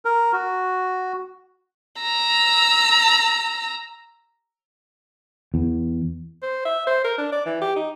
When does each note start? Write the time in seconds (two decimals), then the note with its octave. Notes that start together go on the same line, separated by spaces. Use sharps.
0.05 A#4
0.33 F#4
2.02 A#5 E6
5.54 E2
6.43 C5
6.66 E5
6.87 C5
7.04 A#4
7.18 D4
7.32 D5
7.46 E3
7.61 G4
7.76 D#4